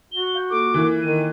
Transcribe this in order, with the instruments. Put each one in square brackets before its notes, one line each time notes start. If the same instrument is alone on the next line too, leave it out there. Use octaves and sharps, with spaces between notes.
[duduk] F#4 [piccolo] G7
[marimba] F5 G6
[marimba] A#3 F4 A4 [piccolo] D6
[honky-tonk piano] E3 A#3 [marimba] F4
[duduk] D#3 [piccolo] D#7